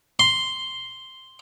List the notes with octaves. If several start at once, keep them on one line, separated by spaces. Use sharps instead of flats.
C6